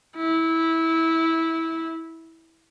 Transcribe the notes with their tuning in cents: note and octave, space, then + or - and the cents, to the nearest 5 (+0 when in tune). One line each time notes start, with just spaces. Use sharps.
E4 -15